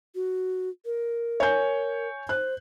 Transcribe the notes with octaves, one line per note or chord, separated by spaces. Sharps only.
F#4
A#4
C#5 G#5 G6
C5 F#6